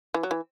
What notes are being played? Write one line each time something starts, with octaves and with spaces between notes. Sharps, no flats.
E3
F#3
E3